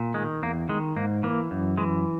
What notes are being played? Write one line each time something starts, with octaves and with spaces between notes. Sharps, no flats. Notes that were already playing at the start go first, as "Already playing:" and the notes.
Already playing: A#2
D#3 G#3
E2 A#3
D#3 G#3
G#2 A#3
E3 A#3
F#2
E3 G#3